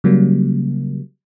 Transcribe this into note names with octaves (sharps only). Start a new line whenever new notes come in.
C#3 F#3 G3 A#3